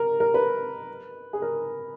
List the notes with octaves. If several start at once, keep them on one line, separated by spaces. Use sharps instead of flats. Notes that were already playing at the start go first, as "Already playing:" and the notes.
Already playing: A#4
A#4
B4
G#4
A#4